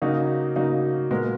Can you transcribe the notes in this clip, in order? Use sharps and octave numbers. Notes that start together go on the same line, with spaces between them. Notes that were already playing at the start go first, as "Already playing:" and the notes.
C#3 F#3 A#3 D#4 F#4
C#3 F#3 A#3 D#4 F#4
A#2 G#3 B3 F#4 A#4